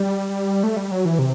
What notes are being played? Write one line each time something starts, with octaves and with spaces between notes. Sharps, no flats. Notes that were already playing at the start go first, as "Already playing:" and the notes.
Already playing: G3
A3
G3
F#3
E3
C3